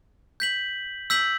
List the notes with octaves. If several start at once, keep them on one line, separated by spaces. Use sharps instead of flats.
G6 B6 F#7
E6 G6 B6 F#7